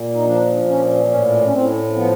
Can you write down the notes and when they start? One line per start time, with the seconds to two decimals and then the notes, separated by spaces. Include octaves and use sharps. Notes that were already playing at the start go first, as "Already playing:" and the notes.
Already playing: A#2
0.15 D#4
0.25 F3 D4
0.68 A#2 C#4
1.10 A2 C#4
1.44 C#4
1.52 A2 C4
1.95 F3 B3